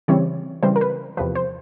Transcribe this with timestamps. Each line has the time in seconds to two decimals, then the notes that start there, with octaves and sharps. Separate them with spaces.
0.08 C#3 E3 G3 C4 C#5
0.63 C#3 E3 G3 C4 C5
0.76 A#4
0.81 B4
1.17 E2 C3 F3 B4
1.35 C5